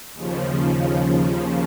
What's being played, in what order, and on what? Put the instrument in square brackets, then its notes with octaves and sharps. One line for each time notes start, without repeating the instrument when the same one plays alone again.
[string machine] D#2 C#3 F3